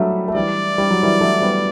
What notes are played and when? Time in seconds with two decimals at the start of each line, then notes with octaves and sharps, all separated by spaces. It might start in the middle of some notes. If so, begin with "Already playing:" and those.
Already playing: F#3 G3 A3
0.28 A3
0.35 E3 G3 D5
0.78 G3
0.91 F#3
1.03 E3 G3
1.21 F#3 A3
1.42 G3 B3